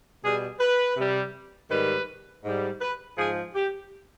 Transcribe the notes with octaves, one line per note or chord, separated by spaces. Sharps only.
B2 G3 G#4
B4
C3 G3
G#2 D#3 G3 B4
G#2 G3
B4
G#2 F3 G#4
G4